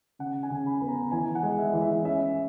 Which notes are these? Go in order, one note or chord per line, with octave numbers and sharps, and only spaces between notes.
C#3 F#5
G#5
C#3
B5
B3
A#5
E3 G#5
F#5
G#3
E5
E3
E5
C#4 E5